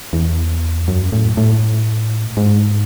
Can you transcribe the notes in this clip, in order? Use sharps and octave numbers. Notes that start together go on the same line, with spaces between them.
E2
F#2
A2
A2
G#2